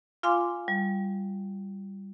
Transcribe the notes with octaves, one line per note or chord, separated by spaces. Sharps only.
F4 F5 G#5 C6 D6
G3